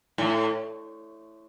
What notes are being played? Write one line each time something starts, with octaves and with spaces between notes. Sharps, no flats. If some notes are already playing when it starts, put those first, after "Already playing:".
A2